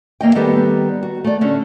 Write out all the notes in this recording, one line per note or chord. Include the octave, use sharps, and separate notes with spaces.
E2 A#3 D#5 G5
D#3 G3 B3 G4 A4 B4
F#4
A3 D5
D3 C#4